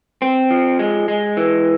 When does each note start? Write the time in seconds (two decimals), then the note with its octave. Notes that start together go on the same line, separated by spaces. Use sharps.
0.22 C4
0.51 F3
0.79 G#3
1.08 G#3
1.37 E3